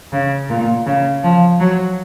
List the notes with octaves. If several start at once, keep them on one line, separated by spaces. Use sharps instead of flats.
C#3
A#2
C#3
F3
F#3